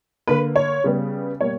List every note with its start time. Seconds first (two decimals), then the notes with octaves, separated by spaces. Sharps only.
0.27 D3 A#3 B4
0.56 C#5
0.84 C#3 G3 B3
1.41 B2 G3 A#3 C#5